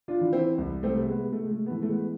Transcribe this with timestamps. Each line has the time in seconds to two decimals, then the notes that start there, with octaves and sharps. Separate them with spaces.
0.08 D4 F4
0.21 E3
0.33 C4 E4
0.58 C2
0.83 A3 C4
0.96 C3
1.08 G#3 B3
1.33 C3 A3
1.44 G#3
1.51 A3
1.66 B3
1.70 E3 A3
1.82 A3
1.89 G#3 B3